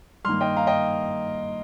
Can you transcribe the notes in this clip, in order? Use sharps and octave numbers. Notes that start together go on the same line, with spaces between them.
G2 D#3 A#3 C6 F6
D#5 G5
F5 A#5
D#5 G5